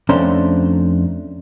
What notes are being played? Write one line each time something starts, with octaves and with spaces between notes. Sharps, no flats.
F2 A3 C#4 D4 C5 A#5